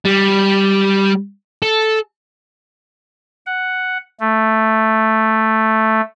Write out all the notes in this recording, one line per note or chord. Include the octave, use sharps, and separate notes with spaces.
G3
A4
F#5
A3